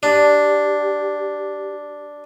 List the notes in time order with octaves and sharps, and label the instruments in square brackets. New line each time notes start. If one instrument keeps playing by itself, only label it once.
[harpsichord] D4 [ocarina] G4